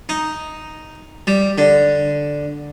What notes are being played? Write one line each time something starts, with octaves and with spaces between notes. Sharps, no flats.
D#4
G3
D3